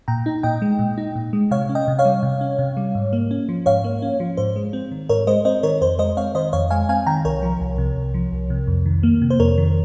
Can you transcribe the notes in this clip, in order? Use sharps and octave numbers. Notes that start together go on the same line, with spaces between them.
A#2 G5 A#5
D#4
A#2 D#5 G5
G#3
A#2
D#4
A#2
G#3
C3 C#5 F5
C#4
D#5 G5
C3
C#5 F5
G3
C3
C#4
C3
G3
G#2
A#3
C#4
F3
G#2 C#5 F5
A#3
C#4
F3
G#2 C5
G#3
C4
D#3
G#2 A#4 C#5
G#3 C5 D#5
C4 C5 D#5
D#3 A#4 C#5
F2 C5
G#3 C5 D#5
C4 C#5 F5
D#3 C5 D#5
F2 C#5 F5
G#3 F5 G#5
C4 F5 G#5
D#3 G5 A#5
C2 A#4 C#5
F3
C2
C3
C2
F3
C2
C3
F2
D#3
A#3
C3
C5
F2 A#4 C#5
D#3